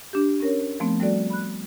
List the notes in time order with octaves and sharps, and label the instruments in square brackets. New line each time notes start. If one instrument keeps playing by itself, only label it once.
[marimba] D4 G4
C#4 A#4 C#5
F3 A3 B3 C4
G3 A3 F#4 A4 D5
B5 F#6